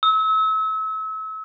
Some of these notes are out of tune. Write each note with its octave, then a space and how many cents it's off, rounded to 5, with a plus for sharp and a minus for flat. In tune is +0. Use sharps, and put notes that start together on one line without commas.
E6 -35